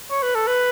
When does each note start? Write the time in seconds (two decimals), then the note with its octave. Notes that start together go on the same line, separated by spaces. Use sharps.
0.11 C#5
0.23 B4
0.35 A4
0.47 B4